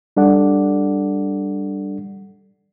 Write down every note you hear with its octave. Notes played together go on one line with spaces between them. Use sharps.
G3 D4 A4 D5 F#5